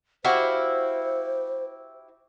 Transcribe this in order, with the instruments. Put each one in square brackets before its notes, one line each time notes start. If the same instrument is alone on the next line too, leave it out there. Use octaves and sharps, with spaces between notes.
[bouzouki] E4 [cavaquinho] F#4 G4 F5 [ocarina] C5